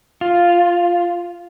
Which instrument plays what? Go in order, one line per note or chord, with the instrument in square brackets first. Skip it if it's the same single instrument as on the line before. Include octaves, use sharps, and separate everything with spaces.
[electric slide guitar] F4